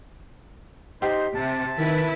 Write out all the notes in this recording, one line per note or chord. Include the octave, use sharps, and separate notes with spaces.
D#4 G4 C5 C6
C3 A5
D#3 E4 B4